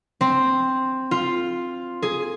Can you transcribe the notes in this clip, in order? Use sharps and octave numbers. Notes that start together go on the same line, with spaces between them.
C4
F4
G#4